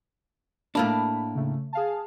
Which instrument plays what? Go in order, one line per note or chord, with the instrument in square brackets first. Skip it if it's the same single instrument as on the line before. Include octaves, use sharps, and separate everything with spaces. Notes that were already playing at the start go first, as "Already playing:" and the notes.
[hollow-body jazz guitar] A2 A#3 D4 [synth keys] B5
[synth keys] C#3 A3
G#4 F5 A5